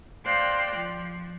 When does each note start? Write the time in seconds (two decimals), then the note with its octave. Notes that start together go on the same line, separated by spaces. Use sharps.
0.24 C5 D5 F5 G5 F#6 A#6
0.75 F3